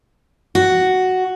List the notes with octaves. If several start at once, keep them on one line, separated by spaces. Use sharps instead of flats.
F#4